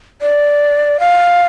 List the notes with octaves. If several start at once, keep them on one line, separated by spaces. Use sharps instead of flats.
D5
F5